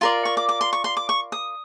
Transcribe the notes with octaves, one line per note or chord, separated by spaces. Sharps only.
F4 A#4 D5 C6
C#6
D6
D6
C6
C#6
C6
D6
C#6
D#6